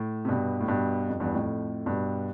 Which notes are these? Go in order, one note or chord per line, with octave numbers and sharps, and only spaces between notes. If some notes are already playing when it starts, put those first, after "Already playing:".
Already playing: A2
C3
G2 B2
A2
G2 B2
F2
E2 G2
F2 A2
G2 B2